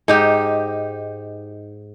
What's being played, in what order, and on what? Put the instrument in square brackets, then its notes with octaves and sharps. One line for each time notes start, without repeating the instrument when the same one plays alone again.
[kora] G#2 D#4 G4